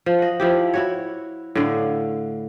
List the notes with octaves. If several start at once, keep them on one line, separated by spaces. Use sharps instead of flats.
F3
D#5 F#5
F3 E4 G4
E4 F#4 C#5
A2 D3 F5